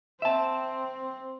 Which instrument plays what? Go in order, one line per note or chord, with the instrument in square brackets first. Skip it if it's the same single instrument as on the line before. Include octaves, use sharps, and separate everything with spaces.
[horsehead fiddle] C4 [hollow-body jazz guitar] E5 A5